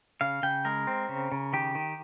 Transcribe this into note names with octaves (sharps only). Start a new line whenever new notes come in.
C#3 F5
C#3 G5
G#3 A#4
C4
C#3
C#3
D#3 G4
D#3